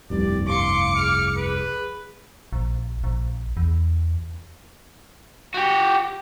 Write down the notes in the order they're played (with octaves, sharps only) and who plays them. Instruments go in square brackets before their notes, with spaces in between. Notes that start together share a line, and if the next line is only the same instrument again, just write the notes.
[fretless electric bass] F1 C2 G2 [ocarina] G4 [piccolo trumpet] D5
[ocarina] F5 [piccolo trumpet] C6 [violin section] D6 C#7
[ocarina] G#4 [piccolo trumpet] F6
[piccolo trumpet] B4
[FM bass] A#1
A#1
E2
[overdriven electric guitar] F#4 G4